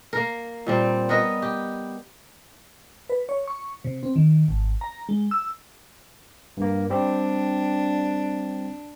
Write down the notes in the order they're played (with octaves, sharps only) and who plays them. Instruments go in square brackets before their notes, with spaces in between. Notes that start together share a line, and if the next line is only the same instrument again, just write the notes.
[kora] A#3 A#4
A#2 G3 C4
B3 A#4 B4 D#5
G4
[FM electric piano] B4
C#5
C#6
C3
C4
D#3
G#1
A#5
G#3
E6
[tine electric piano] G2 A#3
[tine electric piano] G3 C4 G4 [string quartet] D4